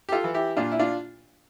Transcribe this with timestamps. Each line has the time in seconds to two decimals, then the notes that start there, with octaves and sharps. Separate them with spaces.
0.09 G4
0.12 F4 A4
0.24 E3
0.34 E4 G4
0.57 A#2 D4 F4
0.72 E4
0.79 D4 F4